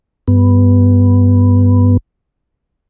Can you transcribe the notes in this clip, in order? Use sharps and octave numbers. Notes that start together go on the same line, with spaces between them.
G2 B3